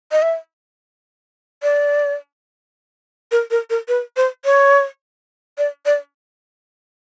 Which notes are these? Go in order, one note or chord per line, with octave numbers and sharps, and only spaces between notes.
D#5
E5
D5
A#4
A#4
A#4
B4
C5
C#5
D5
D5